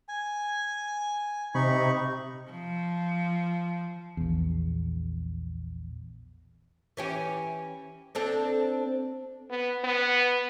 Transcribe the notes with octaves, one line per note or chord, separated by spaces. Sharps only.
G#5
C3 D#4 B5 C#6
F3
A#1 E2
E3 C#4 G4
C4 D4 A4
B3
B3